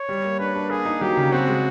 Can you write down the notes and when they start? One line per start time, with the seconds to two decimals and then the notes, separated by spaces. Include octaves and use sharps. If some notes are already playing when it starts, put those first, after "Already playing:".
Already playing: C#5
0.09 G3
0.24 A#3
0.39 D4 B4
0.55 D4
0.70 A#3 G#4
0.85 D#4
1.01 F#3 G4
1.17 C#3
1.32 C4 F#4
1.48 G#3